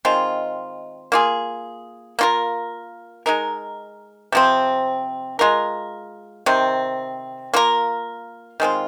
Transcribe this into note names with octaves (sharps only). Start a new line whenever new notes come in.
D#3 G#3 C4 F4
A#3 F4 G#4
A#3 F4 A#4
G#3 D#4 A#4
C3 F3 C4
G#3 F4 A#4
C3 D#3 C4
A#3 F4 A#4
D#3 G#3 C4 F4